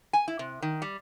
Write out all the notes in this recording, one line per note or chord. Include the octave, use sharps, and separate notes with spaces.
G#5
E4
C3
D#3
G3